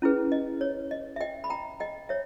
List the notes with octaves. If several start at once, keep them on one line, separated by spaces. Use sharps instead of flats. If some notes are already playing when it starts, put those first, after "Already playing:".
C#4 E4 G#4 B4
D#5
C#5
D#5
E5
D#5 G5
B5
G5 A#5
D#5 G5
C#5 E5